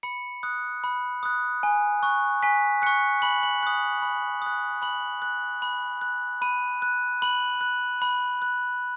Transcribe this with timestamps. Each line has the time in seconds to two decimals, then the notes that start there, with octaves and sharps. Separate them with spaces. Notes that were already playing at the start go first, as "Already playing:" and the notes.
0.03 B5 C#7
0.43 D#6 F#6
0.84 B5
1.23 D#6 F#6
1.63 G#5
2.03 C#6 F#6
2.43 G#5 B6
2.82 C#6 F#6 C#7
3.22 B5 F#7
3.43 F#7
3.63 D#6 F#6
4.02 B5
4.42 D#6 F#6
4.82 B5 F#7
5.22 F#6
5.62 B5
6.02 F#6
6.42 B5 D#7
6.82 F#6
7.22 B5 F#7
7.61 F#6
8.02 B5
8.42 F#6